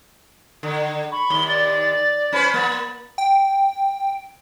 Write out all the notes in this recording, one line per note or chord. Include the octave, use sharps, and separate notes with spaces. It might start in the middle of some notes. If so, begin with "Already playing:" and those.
D3
B5 C#6
D#2 G7
D5 A6
C#4 B4 C5 B5
A#3 A6
G5